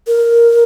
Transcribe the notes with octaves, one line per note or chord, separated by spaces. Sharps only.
A#4